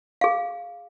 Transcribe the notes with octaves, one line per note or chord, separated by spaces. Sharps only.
G#4 F5